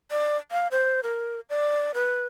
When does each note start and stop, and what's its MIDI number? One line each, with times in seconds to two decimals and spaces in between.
0.11 0.37 74
0.51 0.68 77
0.71 1.00 72
1.03 1.40 70
1.50 1.92 74
1.94 2.27 71